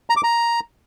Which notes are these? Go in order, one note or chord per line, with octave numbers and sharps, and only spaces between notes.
A#5
D6
A#5